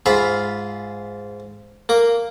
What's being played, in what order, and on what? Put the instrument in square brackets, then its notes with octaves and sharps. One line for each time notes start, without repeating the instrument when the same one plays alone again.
[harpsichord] G#2 F4 E5 F5 B5
A#3 D6